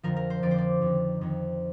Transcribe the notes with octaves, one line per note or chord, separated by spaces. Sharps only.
F2 D3 F3 A#4
A#4
C5
F2 D3 F3 D5
C5
D5
F2 D#3
F2 D#3